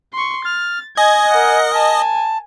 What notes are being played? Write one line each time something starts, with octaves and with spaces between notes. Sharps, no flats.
C6 C#6
F6 A6
D#5 G#5 G#6
A#4 F#5
G#5 A5